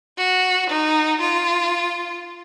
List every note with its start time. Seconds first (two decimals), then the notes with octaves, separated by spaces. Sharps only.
0.17 F#4
0.69 D#4
1.20 F4